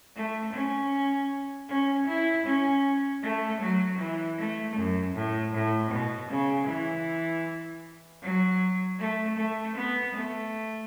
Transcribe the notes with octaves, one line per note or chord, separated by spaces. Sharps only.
A3
C#4
C#4
E4
C#4
A3
F#3
E3
A3
F#2
A2
A2
B2
C#3
E3
F#3
A3
A3
B3
A3